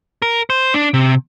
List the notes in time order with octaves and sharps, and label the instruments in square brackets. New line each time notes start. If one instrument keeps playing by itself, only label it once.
[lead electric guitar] A#4
C5
D4
C3